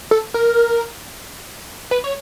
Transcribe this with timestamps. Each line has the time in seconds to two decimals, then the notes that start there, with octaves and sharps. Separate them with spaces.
0.11 A4
0.34 A#4
1.91 B4
2.04 C#5